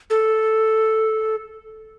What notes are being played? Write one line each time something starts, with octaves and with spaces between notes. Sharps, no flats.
A4